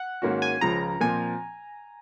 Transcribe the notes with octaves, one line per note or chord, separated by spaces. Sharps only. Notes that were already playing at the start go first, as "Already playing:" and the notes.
Already playing: F#5
G#2 D#3 A#3 C#4 F#4
G#5
C#2 C#3 F3 A#5
A#2 F3 C4 G#5